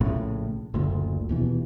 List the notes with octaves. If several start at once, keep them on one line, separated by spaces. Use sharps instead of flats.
A#1 A2 C#3
F#1 D2 A#2
D#1 B2 E3